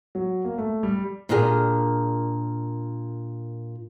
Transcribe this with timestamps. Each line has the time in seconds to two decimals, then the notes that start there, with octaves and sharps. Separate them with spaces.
0.15 F#3
0.44 A#3
0.58 A3
0.83 G3
1.29 A#2 D4 G4 G#4 A#4